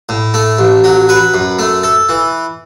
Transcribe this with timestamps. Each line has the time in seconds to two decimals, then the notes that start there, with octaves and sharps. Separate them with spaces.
0.09 A2
0.34 A3
0.59 A1
0.84 F#3
1.09 B4
1.34 F#2
1.59 A3
1.83 A4
2.09 E3